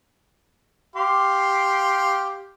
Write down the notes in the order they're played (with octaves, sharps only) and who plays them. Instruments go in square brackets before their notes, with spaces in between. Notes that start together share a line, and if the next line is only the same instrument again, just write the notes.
[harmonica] G4 F5 C6